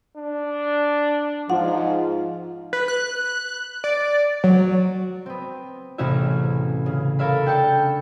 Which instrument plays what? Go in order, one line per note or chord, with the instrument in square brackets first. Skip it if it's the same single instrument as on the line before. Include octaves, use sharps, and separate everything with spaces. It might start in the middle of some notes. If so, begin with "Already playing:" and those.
[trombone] D4
[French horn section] G#2 F3 [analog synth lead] F4 [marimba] F#5
[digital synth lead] B4
F#6
D5
F#3
[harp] B3 C4
A1 E2 C3 C#4 F#4 E5
C#3
A4 A#4 C#5 E5 F5 B5
C#4 D4 G5 A5 E6 C#7